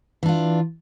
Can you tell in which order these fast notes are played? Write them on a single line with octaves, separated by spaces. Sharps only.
E3 D4 F4